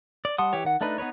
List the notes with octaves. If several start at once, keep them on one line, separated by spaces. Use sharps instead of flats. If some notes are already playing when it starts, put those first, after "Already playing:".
D5
G3 F#5 A5 C6 D#6
E3 G4 C#5
D#3 F#5
A3 D4 D#4 B4
B3 D#4 B4 C#5